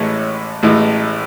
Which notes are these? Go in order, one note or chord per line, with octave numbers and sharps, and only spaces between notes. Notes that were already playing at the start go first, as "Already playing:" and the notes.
Already playing: A1 A2 E3 G#3 C#5
A1 A2 E3 G#3